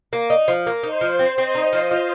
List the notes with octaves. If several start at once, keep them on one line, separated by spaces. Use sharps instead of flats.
A#3
D#4
F3
A#3
D#4 C5
F3
C4
C4 D#5
D#4
F3
F4